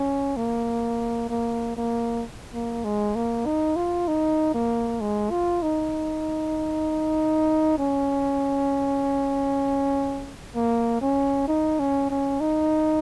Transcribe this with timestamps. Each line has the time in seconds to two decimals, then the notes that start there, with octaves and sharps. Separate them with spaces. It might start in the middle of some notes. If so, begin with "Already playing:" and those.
Already playing: C#4
0.37 A#3
1.29 A#3
1.77 A#3
2.54 A#3
2.84 G#3
3.15 A#3
3.46 D#4
3.76 F4
4.08 D#4
4.54 A#3
5.01 G#3
5.30 F4
5.62 D#4
7.78 C#4
10.55 A#3
11.01 C#4
11.48 D#4
11.80 C#4
12.10 C#4
12.41 D#4